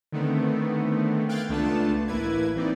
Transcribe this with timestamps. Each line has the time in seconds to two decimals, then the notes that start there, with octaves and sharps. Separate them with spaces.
0.12 D3 D#3 A3 B3 C4
1.29 F5 G5 F#6 G#6 A6
1.49 C#2 A3 B3 D4 F4 A5
2.08 A1 A#3 E4 B4 G#6
2.56 E3 C4 D#4 D5